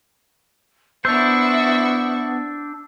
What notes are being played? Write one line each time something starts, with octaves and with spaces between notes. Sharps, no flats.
B3 D4 E4 C5 C#6 E6